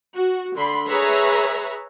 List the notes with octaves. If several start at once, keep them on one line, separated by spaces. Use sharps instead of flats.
F#4
D3 B5 C6
G#4 B4 C#5 E5 A#5